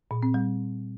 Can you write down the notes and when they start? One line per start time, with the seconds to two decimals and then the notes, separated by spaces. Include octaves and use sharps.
0.11 A#2
0.23 C4
0.34 G3